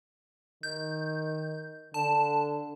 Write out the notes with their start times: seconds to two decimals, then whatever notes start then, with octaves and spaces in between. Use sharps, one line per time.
0.63 D#3 G6
1.94 D3 A5